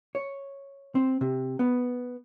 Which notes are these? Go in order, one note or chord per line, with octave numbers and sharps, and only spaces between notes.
C#5
C4
C3
B3